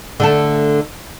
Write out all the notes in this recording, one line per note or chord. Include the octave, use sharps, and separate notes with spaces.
D3 A3 A4